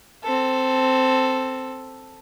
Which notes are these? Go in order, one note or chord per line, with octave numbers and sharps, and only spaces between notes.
C4 A4